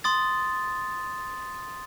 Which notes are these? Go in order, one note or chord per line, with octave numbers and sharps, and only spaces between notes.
C6 D#6 A6